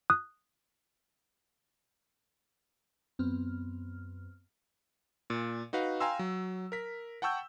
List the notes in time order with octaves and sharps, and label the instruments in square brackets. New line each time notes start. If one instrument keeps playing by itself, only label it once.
[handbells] D#6 F#6
[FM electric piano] F#2 B3 C4 F6
[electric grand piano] A#2
D#4 F#4 B4 F5
F5 G5 G#5 A#5 C6 E6
F#3
A#4 B6
F#5 G5 A5 C#6 E6 G6